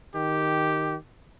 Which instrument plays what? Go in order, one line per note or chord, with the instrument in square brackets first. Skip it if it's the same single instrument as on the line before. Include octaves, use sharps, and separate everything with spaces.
[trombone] D#3 [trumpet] G4